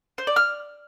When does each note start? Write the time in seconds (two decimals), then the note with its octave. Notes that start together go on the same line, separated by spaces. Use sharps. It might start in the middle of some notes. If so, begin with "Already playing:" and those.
0.18 C5
0.27 D5
0.36 F6